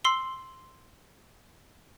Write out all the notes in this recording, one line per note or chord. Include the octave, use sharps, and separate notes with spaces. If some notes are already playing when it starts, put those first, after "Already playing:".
C6 E6 C7 F#7 G7